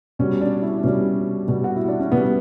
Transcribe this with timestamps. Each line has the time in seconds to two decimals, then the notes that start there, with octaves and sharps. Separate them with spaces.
0.19 B2 G3 C#4
0.41 D4
0.62 E4
0.83 B2 G3 C#4
1.48 B2 G3
1.64 F#4
1.76 E4
1.88 D4
2.00 C#4
2.12 B2 G3 B3